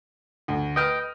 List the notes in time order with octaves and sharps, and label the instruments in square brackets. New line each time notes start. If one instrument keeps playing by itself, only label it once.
[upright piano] D2
[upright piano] B4 D#6 F6 [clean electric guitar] D#5 G5